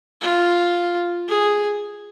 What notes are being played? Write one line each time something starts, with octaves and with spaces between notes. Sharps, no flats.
F4
G#4